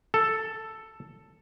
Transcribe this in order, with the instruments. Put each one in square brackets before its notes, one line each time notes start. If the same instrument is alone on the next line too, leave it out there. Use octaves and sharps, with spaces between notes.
[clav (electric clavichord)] A4